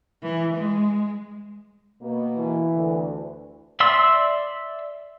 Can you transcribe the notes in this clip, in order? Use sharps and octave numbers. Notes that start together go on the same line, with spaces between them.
E3
G#3
B2 A#3
E3
D2
D5 E5 C6 E6